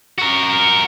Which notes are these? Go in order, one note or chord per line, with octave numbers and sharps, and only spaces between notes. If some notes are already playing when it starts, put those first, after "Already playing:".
F#4 A#4